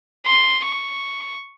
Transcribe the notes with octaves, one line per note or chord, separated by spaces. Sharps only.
C6
C#6